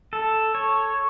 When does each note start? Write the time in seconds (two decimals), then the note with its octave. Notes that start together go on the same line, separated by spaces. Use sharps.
0.13 A4
0.55 C#5